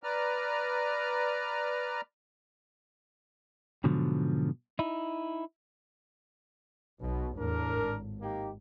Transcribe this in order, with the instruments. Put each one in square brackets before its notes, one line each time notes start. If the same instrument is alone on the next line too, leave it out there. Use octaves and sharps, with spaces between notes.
[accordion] B4 D5 A#5 F6
[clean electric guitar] G#2 B2 D3 F3 F#3
D#4 E4
[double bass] B1 [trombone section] B2
[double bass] E2 A2 [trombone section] D4 A#4
[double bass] G#1
[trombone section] A#3 D#4 G4